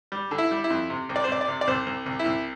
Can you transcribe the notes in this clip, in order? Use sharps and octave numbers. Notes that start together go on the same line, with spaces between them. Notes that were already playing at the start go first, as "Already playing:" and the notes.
G3
D3
E4
G3
E4
F2
C3
C2
D5
C5
C2 D5
D5
C3
D5
C2 C5
C2
C2
E4
C2